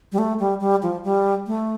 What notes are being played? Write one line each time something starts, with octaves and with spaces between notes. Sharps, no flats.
G3
A3
G3
G3
F3
G3
A3